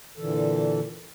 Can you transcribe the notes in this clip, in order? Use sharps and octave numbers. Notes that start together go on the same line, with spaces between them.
A#2 D3 E3 A4